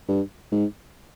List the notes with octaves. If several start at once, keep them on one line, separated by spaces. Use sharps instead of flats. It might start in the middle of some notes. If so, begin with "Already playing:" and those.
G2
G#2